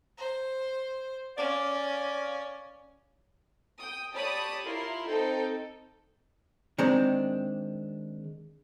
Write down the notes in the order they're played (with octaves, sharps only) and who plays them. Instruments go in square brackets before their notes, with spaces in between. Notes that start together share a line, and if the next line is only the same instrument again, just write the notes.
[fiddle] C5
[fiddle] C#4 [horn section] D5 F5
[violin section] G5 D#6
G4 C#5 D5 A5 B5 D#6
E4 F4 A#4 C6
C4 D#4 A4 G5
[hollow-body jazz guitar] D#3 G#3 C4 D4